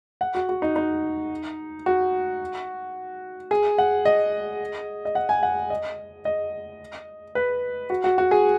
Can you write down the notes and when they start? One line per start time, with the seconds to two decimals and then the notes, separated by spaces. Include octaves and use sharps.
0.21 F#5
0.35 F#4
0.49 F#4
0.62 D#4
0.76 D#4
1.86 F#4
3.51 G#4
3.78 F#5
4.05 D#5
5.05 D#5
5.15 F#5
5.29 G#5
5.43 F#5
5.70 D#5
6.25 D#5
7.35 B4
7.90 F#4
8.04 F#4
8.18 F#4
8.31 G#4